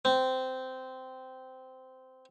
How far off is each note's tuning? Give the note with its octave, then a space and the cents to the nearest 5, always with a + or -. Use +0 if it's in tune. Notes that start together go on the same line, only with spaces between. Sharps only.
C4 -15